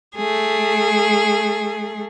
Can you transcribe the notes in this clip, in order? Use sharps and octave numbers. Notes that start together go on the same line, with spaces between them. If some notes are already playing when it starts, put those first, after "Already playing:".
A3 G#4